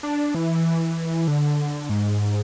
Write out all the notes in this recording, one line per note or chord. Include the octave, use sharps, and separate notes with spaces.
D4
E3
D3
G#2